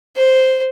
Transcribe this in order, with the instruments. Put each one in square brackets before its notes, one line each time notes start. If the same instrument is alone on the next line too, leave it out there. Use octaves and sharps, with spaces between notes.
[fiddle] C5